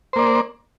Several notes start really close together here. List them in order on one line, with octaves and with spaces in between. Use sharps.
C5 A#3 D5